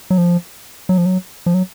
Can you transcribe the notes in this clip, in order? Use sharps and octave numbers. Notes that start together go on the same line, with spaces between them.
F#3
F3
F#3
F3
F#3
F3
F#3